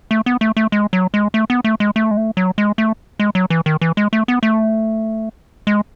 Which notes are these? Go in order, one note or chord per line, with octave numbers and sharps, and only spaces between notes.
A3
B3
A3
A3
G#3
F#3
G#3
A3
B3
A3
G#3
A3
G#3
A3
F#3
G#3
A3
G#3
F#3
E3
D#3
E3
G#3
A3
B3
A3
G#3